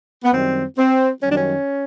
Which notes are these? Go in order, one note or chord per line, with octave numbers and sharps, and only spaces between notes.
B3
F#2 D#3 G3 C4
C4
F#2 D#3 G3 C#4
D4
C#4